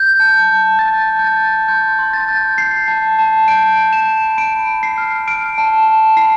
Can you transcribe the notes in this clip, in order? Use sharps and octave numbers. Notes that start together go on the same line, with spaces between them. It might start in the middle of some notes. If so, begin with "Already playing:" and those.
Already playing: G6
A5
A5
G6 A6
A5
G6
A6
A5
C6 G6
C6
A6
G6
G6 C7
A5
A5
G6 D7
B5
E7
B5
B5 D7
B5
C7
F6
F6 D7
A5
A5
B5 C7